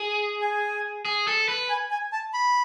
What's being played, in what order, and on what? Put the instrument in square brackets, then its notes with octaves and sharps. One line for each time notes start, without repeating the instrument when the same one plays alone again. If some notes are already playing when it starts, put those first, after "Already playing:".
Already playing: [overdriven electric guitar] G#4
[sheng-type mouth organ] G#5
[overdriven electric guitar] G#4
A4
B4
[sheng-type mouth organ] G#5
G#5
A5
B5